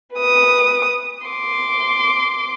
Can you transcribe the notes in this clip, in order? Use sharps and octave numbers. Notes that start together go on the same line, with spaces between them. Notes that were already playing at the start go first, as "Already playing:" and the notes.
B4 D#6
C6 D6